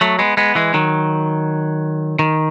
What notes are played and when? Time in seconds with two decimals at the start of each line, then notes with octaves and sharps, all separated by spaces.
0.01 F#3 A3
0.19 G#3 B3
0.37 G#3 B3
0.55 E3 G#3
0.74 D#3 F#3
2.19 D#3